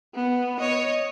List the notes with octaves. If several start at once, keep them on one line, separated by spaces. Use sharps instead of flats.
B3
C#5 D#5